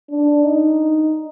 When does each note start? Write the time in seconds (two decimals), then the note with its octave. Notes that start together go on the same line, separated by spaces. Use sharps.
0.10 D4
0.44 D#4